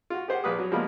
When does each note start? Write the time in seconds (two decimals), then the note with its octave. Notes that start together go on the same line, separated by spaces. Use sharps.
0.10 F4 F#4
0.28 G4 G#4 C5 F#5
0.44 A#1 B4 D#6
0.59 F#3
0.71 C#3 F3 G3 G#3 A#3 B3